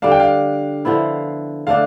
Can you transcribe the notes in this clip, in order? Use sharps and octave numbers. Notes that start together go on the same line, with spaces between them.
D3 G3 D4 F5
G5
F5
D3 F3 B3 E4
D3 A3 D4 F5